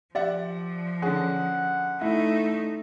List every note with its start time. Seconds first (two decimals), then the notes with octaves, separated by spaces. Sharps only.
0.15 F3 G4 D5 E5 F#5
1.02 D3 C#4 G#4 F#5
2.01 A3 D#4 E4